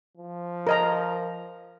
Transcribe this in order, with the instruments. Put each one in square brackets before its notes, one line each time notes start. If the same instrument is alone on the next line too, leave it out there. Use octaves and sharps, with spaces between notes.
[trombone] F3
[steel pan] A#4 D#5 A#5